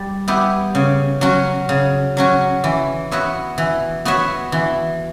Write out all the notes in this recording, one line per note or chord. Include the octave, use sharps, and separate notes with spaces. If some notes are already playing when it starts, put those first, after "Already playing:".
Already playing: G3
B3 E4 G4
C#3
F#3 C#4 F#4
C#3
F#3 C#4 F#4
E3
B3 F#4 C#5 E5
E3
B3 F#4 C#5 E5
E3